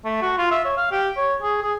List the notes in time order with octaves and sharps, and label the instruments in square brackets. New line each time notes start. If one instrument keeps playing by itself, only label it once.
[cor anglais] A3
F#4
F4
E5
C#5
F5
G4
C#5
G#4
G#4